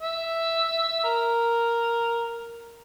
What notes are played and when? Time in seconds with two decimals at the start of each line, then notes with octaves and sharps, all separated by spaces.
0.02 E5
1.04 A#4